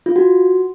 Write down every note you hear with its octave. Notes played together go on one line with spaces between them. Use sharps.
F4
F#4